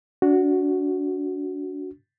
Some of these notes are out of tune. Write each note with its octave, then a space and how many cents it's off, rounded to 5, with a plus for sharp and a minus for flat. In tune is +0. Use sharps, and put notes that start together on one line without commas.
D4 -25 F#4 +0